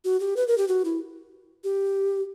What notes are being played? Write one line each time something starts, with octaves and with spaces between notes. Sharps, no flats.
F#4
G4
B4
A#4
G4
F#4
E4
G4